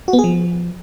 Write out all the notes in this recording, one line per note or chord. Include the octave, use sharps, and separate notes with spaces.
F#4
B3
G#4
F3